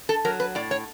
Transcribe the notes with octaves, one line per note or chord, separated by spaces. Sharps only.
A4
F#3 A#4
B4
A2 D5
C#5